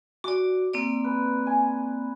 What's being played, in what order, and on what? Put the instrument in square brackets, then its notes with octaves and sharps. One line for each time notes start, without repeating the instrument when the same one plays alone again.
[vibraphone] F#4 D5 [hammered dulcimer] D6
[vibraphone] A#3 C4 D5
[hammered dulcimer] B4
G#5